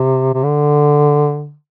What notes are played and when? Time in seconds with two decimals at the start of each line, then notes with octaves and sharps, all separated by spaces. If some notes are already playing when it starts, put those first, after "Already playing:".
Already playing: C3
0.34 C3
0.43 D3